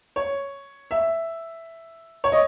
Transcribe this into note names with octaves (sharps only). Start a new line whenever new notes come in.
C#5
E5
C#5
D#5